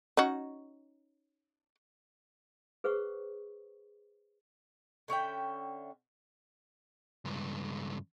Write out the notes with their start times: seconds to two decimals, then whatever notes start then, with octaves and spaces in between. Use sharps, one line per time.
0.17 C#4 D#4 F#4
2.84 G#4 B4 C5 F#5 C#6 D#6
5.08 D3 C#4 E5 G5
7.25 C#2 G2